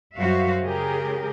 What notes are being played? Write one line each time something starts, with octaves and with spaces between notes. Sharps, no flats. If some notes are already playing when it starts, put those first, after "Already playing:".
F#2 G3 F#4 C5 E5 F5
C#3 G#3 G4 G#4 A#4